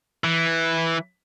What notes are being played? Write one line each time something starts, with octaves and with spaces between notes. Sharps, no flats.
E3